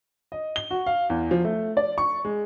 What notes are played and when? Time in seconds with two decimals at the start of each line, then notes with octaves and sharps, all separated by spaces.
0.32 D#5
0.56 G7
0.71 F#4
0.86 F5
1.10 E2
1.31 F3
1.44 A3
1.77 D5
1.98 C#6
2.25 G#3